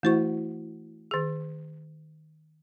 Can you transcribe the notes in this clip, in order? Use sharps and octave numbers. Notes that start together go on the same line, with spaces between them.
E3 A3 E4 F#4 C5 C#6
D#3 G#4